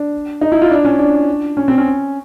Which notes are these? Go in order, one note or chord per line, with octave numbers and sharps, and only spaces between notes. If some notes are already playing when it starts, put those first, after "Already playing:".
Already playing: D4
D#4
E4
F4
D4
C#4
D4
C#4
C4
C#4